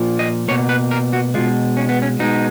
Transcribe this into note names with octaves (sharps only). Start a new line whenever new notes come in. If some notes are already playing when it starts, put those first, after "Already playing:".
Already playing: A#2 F3 A#3
D#5
B2 A#3 C#5
B4
A#4
F#4
B2 G#3 F4
C#4
B3
C#4
B2 G#3 D#4